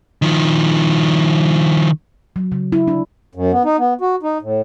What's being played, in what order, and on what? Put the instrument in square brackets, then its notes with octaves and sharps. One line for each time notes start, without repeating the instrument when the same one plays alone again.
[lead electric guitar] D#3 F3
[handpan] F#3
C#3
E4
D4
[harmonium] F#2
B3
D#4
B3
F#4
D#4
A2